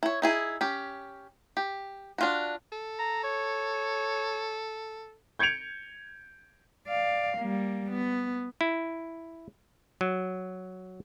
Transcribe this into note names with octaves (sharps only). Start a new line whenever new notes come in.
E4 C#5
D#4 E4 G#4
C#4 G4
G4
D4 F4 F#4
A4
A#5
C#5
G6 G#6 C#7 D7 F7
D5 F5
G3 A#3
B3
E4
F#3